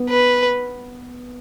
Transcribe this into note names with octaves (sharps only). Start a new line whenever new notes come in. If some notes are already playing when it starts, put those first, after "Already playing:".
Already playing: B3
B4